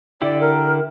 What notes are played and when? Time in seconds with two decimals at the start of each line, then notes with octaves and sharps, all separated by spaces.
0.22 D3 E4 G4 D5
0.41 A#4